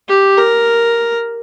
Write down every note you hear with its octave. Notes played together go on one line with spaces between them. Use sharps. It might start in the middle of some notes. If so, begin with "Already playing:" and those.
G4
A#4